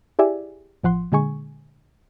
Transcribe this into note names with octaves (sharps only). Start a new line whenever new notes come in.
E4 G4 G#4 D5 E5 G#5
A1 F3 F#5 C6
A#2 D3 G#3 G#5 C#6